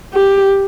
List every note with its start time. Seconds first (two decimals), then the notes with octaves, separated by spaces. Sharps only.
0.14 G4